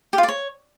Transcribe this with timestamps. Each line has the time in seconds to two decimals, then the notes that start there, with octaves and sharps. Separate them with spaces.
0.13 G4
0.18 F4
0.23 D5
0.28 C#5